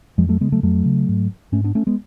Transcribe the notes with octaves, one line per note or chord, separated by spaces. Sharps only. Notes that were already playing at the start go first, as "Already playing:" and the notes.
F2 F3 G#3
F#3 A3
C#3 G#3 B3
F#3 A3
F2 F#3 A3
C#3
G#2
G#2 A3 C#4
B3 D4
A3 C#4
G#3 B3